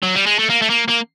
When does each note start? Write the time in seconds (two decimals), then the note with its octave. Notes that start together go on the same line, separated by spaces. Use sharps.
0.03 F#3
0.15 G3
0.26 G#3
0.39 A3
0.50 A#3
0.62 A3
0.70 A#3
0.89 A#3